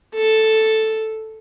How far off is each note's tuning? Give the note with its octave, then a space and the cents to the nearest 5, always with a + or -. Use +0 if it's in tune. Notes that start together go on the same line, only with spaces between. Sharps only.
A4 +0